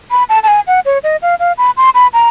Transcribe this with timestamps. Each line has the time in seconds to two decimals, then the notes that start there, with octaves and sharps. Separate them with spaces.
0.11 B5
0.29 A5
0.43 A5
0.48 G#5
0.67 F#5
0.86 C#5
1.04 D#5
1.22 F5
1.40 F5
1.58 B5
1.77 C6
1.95 B5
2.13 A#5